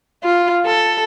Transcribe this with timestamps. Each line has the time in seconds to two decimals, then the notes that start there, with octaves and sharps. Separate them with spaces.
0.24 F4
0.66 A4